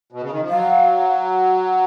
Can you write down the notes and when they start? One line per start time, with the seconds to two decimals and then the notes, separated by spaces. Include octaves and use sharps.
0.12 B2
0.22 C#3
0.31 D#3
0.41 F3
0.50 F#3 F5